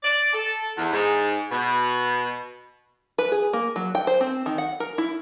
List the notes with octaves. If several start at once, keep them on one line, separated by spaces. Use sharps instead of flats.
D5
A4
E2
G#2
B2
B4
G#4
A#3
F#3
G5
C5
C4
D#3
F#5
A#4
E4